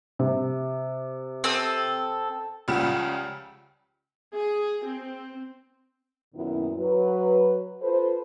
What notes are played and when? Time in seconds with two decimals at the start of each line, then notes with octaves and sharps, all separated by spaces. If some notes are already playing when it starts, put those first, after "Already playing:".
0.19 C3
1.44 C4 A4 D#6
2.68 C#2 C#3 F3 G3 F#5 E7
4.32 G#4
4.85 C4
6.34 F#2 A#2 D#3 B3 E4
6.78 F#3 B4
7.81 F4 A4 B4 C5